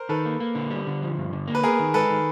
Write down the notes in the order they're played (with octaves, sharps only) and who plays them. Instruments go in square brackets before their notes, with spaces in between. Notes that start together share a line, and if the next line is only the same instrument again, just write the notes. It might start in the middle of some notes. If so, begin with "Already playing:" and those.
Already playing: [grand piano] A#4 C5
[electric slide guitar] D#3 [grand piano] A4 B4
[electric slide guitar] A#3
A#3
D3
G3
D3
F3
G2
D3
A#3
[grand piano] B4
[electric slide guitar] B3 [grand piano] G#4 A#4
[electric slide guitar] D#3
[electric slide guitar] G#3 [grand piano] A4 B4
[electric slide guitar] D#3